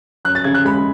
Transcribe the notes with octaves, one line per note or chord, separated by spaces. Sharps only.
F#2 F#6
A6
C#3 G#6
F#6
G#3 B5